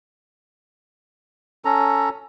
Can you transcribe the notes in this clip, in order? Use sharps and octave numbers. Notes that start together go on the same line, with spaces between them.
C#4 A4 A#5